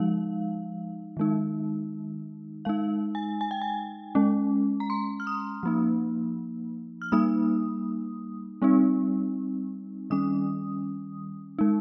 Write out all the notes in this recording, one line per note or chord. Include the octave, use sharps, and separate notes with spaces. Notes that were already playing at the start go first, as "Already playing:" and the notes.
Already playing: F3 G#3 D#4 F5
D#3 G#3 D#4
G#3 D#4 F5
G#5
G#5
G5
G#5
G#3 C#4
A#5
C6
F6
D#6
F3 A#3 D#4
F6
G3 A#3 D#4 D#6
G3 C4 D#4
D#3 G3 C#4 D#6
G#3 D#4